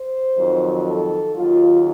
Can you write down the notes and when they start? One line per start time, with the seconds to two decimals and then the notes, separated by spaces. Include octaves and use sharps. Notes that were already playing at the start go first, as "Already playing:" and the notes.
Already playing: C5
0.36 F2 D#3 F#3
0.86 A4
1.36 D#2 D#3 F#3 F4